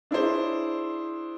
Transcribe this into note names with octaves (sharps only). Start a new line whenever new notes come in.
D4 E4 G#4 C5